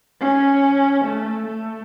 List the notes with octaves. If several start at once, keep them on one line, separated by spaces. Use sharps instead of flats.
C#4
A3
A3